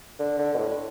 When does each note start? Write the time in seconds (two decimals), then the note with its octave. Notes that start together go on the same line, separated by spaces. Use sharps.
0.19 D3
0.38 D3
0.54 B2
0.57 A2